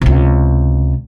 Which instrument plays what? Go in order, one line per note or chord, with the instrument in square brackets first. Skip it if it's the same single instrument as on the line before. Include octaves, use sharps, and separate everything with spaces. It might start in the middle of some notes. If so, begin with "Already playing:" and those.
[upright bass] C#2 C3